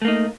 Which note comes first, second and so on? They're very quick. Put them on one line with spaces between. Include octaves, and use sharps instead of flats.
A3 A#3 D#4